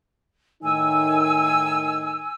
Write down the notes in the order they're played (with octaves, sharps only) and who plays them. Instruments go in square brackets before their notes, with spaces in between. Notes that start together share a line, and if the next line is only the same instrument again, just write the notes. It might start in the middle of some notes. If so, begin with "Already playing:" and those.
[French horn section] A2 D#3 D#4 [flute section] G#5 E6